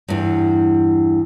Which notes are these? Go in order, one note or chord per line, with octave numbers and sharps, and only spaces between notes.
E2 G2